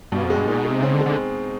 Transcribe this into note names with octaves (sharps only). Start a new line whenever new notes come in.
G2 B2
F2
G#3
G2
A#2 D#4
B2
G#3
C3
C#3 C4
D3
G#3
D3